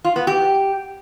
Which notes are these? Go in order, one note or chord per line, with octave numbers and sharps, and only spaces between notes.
F4
B3
G4